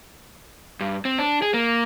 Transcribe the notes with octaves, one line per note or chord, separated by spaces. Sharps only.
G2
C4
D4
G#4
A#3